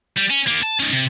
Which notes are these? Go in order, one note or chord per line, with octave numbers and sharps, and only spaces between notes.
G3
C#4
A#3 G4
A5
C#4 D#4
C3